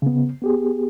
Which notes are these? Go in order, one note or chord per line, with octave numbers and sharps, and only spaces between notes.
C#3 B3
B3 G4 G#4